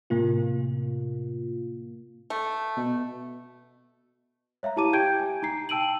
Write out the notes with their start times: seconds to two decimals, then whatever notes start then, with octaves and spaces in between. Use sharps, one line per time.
0.10 A2 C3 A#3 F4
2.30 A3
2.77 B2
4.63 C#5 E5 F5 A#5
4.76 E4 G4 A5 A#5 D6 D#7
4.93 G4 G5 G6 G#6 D7
5.20 G#5
5.43 D#4 A#5 C7
5.69 G5 A5 E6 D7 D#7 F#7